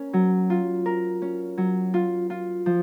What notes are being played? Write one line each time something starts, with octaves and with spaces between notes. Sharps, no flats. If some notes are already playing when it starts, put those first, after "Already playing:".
Already playing: C#4 A#4
F#3
F4
A#4
C#4
F#3
F4
F4
F3